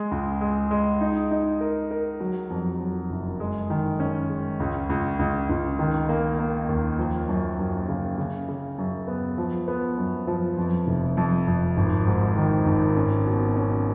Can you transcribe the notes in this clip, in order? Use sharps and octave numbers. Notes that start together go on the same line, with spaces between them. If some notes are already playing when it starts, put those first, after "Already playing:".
Already playing: G#3
C#2
G#3
G#3
D#4
D#4
A#4
A#4
F#3
F2
F#3
F#1
G#3
D#3
C#4
G#3
C#2
C#2
C#2
C#2
D#3
A#3
A#3
D#2
F3
F#2
F#2
C#3
C#3
C#3
F#2
B3
F3
B3
F#2
F3
F2
F1
F2
F2
G#1
G#2
D#3
G#1
C#4
B2
C#4